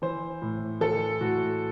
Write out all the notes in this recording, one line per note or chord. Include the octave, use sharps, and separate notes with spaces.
E3 C5
A2
E3 A4
A2 F#4